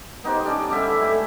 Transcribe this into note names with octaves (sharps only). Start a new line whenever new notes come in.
B3 D#4 G4 C5
C#4 D4 G4
D3 G3 E4 E5
A3 G#5